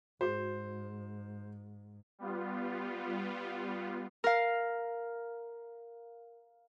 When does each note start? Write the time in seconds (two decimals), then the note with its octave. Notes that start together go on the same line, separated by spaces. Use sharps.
0.21 G#2 F#4 G#4 C5
2.19 G3 B3 F4
4.24 A#4 F5